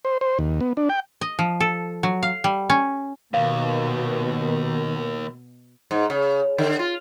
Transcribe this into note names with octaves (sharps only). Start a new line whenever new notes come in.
C5
C5
D#2
B3
D4
G5
D#5
F3
A4
F#3
F5
G3
C#4
D#2 B2 D#3 F5
G#2
C#3
D3
F4